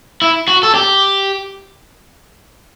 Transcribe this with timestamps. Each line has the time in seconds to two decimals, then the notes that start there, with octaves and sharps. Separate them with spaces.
0.22 E4
0.48 F#4
0.63 A4
0.74 G4